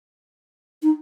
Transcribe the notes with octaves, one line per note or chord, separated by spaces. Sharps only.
D#4